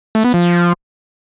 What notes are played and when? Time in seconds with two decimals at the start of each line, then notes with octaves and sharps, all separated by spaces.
0.15 A3
0.24 B3
0.34 F3